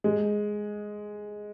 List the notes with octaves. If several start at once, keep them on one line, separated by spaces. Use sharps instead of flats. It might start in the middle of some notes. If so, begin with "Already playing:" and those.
G#3